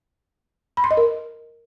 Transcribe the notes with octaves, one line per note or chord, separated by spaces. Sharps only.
B5
C6
D#5
A#4